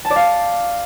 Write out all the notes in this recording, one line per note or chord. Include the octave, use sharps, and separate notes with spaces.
A5
D5
F5